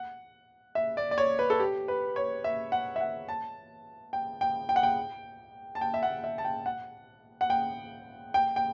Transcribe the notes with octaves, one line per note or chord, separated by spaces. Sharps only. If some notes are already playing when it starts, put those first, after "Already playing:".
Already playing: F#5
E5
D5
D5
C#5
B4
A4
G4
B4
C#5
E5
F#5
E5
F#5
A5
G5
G5
G5
F#5
G5
A5
G5
E5
F#5
E5
A5
G5
F#5
F#5
G5
G5
G5